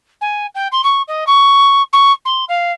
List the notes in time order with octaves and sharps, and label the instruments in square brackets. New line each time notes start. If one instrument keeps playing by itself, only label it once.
[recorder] G#5
G5
C6
C#6
D#5
C#6
C#6
C6
F5